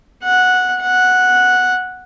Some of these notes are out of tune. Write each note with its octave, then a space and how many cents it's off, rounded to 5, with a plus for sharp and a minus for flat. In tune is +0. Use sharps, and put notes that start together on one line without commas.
F#5 -10
F#5 -5